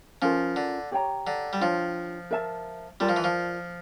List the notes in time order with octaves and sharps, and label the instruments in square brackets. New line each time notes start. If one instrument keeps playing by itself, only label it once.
[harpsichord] F3 [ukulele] C#4 F4 A#4
[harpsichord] D3
[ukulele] G4 C#5 G5 A#5
[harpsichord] D3
G3
[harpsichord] F3 [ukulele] D4 F4 C#5 G5
[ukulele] A#4 E5 A5
[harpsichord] G3 [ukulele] F4 A#4 D5 A5
[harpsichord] F3
E3
F3